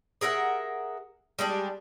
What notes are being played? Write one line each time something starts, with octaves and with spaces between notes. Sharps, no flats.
G#4 A#4 E5 F#5
G3 G#3 D4 G4